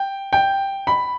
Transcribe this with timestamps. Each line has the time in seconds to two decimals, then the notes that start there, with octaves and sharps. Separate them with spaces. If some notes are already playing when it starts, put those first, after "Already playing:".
Already playing: G5
0.33 G5
0.87 B5